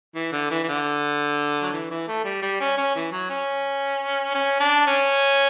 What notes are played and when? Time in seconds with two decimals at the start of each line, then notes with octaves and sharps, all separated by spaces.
0.15 E3
0.32 D3
0.51 E3
0.64 E3
0.68 D3
1.63 F#3
1.73 E3
1.91 E3
2.08 A3
2.25 G3
2.43 G3
2.61 C#4
2.78 C#4
2.96 E3
3.12 F#3
3.30 C#4
4.35 C#4
4.60 D4
4.87 C#4